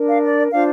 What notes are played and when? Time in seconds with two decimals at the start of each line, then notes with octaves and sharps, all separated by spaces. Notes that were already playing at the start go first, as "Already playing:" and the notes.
Already playing: D4 A#4
0.08 F5
0.23 D5
0.52 D4 F4 C5 F5